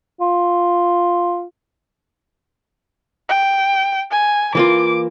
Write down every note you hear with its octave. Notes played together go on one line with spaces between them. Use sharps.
F4
G5
G#5
E3 A#3 F4 D6